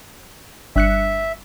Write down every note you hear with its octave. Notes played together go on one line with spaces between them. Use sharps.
G1 E5 F#6 C#7